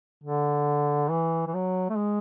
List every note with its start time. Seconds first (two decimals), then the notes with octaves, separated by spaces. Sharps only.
0.24 D3
1.10 E3
1.47 E3
1.54 F#3
1.90 A3
1.96 G#3